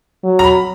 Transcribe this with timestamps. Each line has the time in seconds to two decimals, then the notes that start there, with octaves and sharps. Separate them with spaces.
0.24 F#3
0.39 A#5
0.44 B5